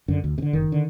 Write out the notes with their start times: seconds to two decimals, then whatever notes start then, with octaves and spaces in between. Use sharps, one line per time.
0.08 F#2 D3
0.24 D2
0.38 C3
0.42 D3
0.53 F#1 D#3
0.72 D3